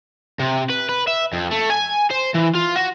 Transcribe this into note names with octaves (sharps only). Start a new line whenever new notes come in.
C3
B4
B4
E5
F2
A3
G#5
C5
E3
F4
F#4